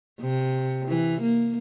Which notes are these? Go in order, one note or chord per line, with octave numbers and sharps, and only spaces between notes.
C3
E3
A#3